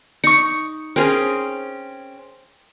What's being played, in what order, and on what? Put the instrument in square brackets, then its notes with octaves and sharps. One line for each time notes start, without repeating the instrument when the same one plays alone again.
[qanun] D#4 [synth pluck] C#6 C#7
[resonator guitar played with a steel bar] C4 C#4 [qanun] G#4 A#4